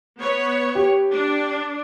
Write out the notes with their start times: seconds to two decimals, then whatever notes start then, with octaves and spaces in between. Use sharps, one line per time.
0.18 B3 C#5
0.75 G4
1.12 D4